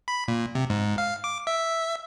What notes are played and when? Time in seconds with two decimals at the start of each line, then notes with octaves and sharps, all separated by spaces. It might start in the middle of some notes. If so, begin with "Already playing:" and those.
0.08 B5
0.28 A#2
0.55 C3
0.70 G#2
0.98 F5
1.24 D6
1.47 E5